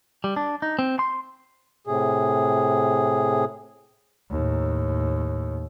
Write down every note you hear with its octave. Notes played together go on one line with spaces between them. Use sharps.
G3
D4
D#4
C4
C6
A2 C3 G#4
D#2 A2